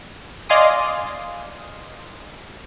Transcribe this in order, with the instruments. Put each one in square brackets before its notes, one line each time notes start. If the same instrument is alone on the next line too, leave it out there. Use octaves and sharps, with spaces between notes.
[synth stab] D5 D#5 F5 G#5 C6 D#6